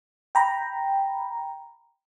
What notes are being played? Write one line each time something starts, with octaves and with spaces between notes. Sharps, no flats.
G5 A#5 B5